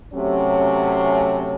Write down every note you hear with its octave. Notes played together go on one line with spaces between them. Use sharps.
C3 F#3 A3 C#4